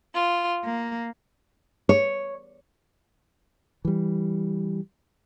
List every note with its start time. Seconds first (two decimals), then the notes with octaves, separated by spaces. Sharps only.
0.14 F4
0.64 A#3
1.89 C#5
3.85 E3 G3